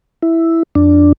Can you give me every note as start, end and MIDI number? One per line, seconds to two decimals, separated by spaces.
0.22 0.63 64
0.75 1.12 41
0.75 1.12 62